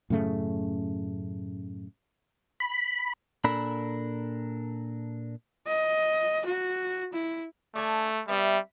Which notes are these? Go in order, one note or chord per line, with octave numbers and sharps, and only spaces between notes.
F#2 A2 C#3 A3
B5
A#2 D4 A4 A#4 B5
D#5
F#4
E4
A3 D4 G#5
G3 B3 C4 E5